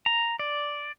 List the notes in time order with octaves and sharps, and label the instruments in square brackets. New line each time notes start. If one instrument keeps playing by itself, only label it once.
[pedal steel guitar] A#5
D5